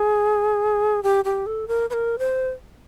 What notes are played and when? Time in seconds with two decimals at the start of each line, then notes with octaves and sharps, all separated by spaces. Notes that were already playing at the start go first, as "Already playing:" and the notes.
Already playing: G#4
1.03 G4
1.25 G4
1.46 A4
1.68 A#4
1.90 B4
1.93 A#4
2.19 C5